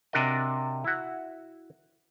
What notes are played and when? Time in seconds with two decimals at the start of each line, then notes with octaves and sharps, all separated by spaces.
0.13 C3 D4 F#4 A#4 D#5
0.84 E4 F#4